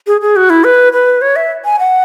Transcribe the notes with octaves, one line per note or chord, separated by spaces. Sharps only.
G#4
G#4
F#4
E4
B4
B4
C#5
E5
G#5
F#5